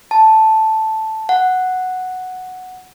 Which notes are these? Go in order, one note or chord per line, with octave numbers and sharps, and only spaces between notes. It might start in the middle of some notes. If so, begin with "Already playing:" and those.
A5
F#5